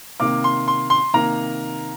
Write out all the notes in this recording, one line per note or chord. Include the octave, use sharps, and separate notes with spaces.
C3 D#3 A#3 D6
C6
C6
C6
C3 D#3 A#3 A#5